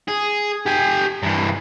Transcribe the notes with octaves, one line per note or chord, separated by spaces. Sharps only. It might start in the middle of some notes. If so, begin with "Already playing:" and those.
G#4
G4 G#5
G2 E3